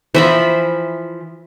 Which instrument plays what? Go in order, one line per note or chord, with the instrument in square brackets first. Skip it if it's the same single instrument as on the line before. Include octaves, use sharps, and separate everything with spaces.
[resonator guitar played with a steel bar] E3 F3 [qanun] C5 E5 B5